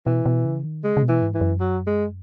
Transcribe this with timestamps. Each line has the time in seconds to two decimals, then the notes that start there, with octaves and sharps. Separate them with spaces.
0.06 B2 E3
0.26 B2
0.45 C#3
0.65 D#3
0.83 C#3 G#3
0.97 C#3
1.03 B2
1.09 E3
1.22 G#2
1.35 E3
1.41 F#2
1.60 F#3
1.87 G#3